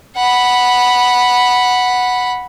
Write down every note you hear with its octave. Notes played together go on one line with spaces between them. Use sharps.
F#5 B5